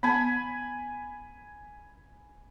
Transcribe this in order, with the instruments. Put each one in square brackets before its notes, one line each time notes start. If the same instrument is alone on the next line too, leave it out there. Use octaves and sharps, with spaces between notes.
[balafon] B3 A5 [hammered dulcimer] G#5 B5